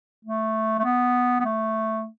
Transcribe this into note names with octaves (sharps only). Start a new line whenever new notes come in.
A3
A3
B3
B3
A3